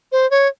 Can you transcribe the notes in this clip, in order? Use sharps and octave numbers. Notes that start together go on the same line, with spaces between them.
C5
C#5